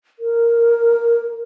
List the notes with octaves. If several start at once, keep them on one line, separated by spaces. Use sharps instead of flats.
A#4